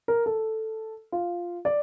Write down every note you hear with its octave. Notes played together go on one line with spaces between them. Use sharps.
A#4
A4
F4
D5